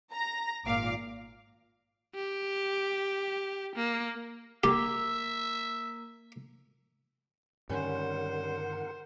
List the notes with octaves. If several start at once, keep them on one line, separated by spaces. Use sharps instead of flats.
A#5 A#6
G#1 A#2 F5 D6
G4
A#3
A#3 G4 E5
G2 D3 D#3 G3 C#4 A#4 C5 F#5